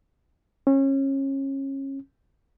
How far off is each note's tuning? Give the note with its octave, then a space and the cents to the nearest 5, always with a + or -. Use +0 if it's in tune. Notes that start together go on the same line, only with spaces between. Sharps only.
C#4 -30